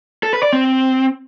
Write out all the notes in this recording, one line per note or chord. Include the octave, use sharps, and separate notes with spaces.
A4
B4
D5
C4